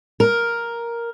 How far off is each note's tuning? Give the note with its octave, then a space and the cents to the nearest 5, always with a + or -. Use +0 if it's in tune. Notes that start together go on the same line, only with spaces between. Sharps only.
A#4 +5